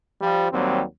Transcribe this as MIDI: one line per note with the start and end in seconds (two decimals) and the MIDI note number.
0.21 0.47 53
0.21 0.47 55
0.52 0.83 39
0.52 0.83 54
0.52 0.83 55
0.52 0.83 60